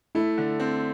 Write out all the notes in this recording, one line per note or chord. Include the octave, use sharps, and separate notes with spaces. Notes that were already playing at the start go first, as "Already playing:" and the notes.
A3 E4
D3
C4